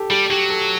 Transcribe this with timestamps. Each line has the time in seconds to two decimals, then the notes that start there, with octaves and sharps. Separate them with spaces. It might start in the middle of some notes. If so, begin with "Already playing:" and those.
Already playing: G4 A4
0.10 G3 G4
0.30 F#3 G4
0.50 A4